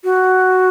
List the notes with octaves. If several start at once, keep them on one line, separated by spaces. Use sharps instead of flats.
F#4